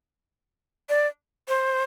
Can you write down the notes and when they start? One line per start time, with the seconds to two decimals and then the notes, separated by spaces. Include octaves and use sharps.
0.89 D5
1.48 C5